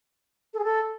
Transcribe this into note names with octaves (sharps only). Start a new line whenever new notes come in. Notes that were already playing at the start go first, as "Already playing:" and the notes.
A4
G#4
A4